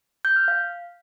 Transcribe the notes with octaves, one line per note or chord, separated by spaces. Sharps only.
G6
F6
F5